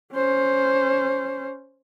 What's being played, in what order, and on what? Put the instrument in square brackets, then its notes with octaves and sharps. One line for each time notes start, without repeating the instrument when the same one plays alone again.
[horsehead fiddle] C#4 C5